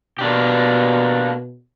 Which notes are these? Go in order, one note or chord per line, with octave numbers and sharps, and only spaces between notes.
B2 A#3 D4 G4